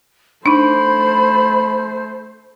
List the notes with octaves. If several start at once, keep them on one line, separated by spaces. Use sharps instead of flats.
A3 D4 D#4 C5 B5